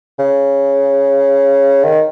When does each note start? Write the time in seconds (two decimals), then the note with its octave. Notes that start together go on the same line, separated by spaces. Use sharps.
0.19 C#3
1.84 D#3